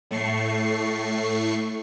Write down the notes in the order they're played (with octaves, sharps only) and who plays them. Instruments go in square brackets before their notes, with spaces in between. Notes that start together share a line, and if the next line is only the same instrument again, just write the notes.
[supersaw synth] A2 A3 C#6 C7